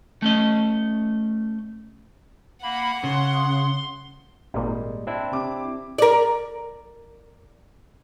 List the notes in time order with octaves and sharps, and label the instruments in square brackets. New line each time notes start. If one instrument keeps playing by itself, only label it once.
[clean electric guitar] A3 C#4 D#5
[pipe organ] A#3 B5 [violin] F#5
[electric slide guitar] C#3 [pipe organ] C6
[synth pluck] G#1 A#2 [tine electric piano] G3 G#3
[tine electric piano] C4 D4 E4
[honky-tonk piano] C3 D6
[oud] A#4 D5